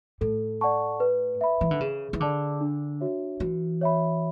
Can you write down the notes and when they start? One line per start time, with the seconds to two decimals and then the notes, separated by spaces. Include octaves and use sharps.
0.21 A2 A4
0.61 D5 F#5 A5 C#6
1.00 B4
1.41 E5 B5
1.61 E3
1.71 D3
1.81 C#3 G#4
2.13 E3
2.20 D3 D5 A5 D6
2.61 D4
3.01 F#4 C#5 E5
3.40 E3 F#4
3.81 C#5 E5 B5